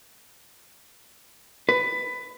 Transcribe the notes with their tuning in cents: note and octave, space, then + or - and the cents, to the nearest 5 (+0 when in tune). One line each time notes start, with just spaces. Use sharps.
B4 +15